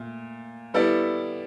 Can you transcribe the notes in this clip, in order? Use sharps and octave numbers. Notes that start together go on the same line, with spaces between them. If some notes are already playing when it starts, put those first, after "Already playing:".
Already playing: A#2 A3
G3 B3 E4 A4 D5